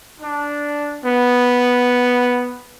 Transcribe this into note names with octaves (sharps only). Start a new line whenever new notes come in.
D4
B3